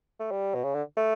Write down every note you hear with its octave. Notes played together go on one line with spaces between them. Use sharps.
A3
G3
B2
C#3
D3
A3